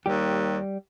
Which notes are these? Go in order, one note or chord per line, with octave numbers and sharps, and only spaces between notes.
D#2 G3 G4